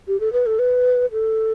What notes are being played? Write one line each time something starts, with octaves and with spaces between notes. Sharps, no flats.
G4
A4
B4
A4
B4
A4